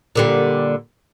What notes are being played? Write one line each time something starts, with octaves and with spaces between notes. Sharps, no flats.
A#2 D3 G3